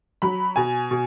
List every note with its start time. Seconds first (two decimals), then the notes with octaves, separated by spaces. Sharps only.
0.22 F#3 B5
0.56 B2 G#5
0.91 B2